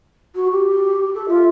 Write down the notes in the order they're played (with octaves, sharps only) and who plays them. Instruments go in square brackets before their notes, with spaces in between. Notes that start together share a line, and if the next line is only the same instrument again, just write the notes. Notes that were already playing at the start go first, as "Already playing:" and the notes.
[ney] F#4
G4
A4
[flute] F4 [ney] E5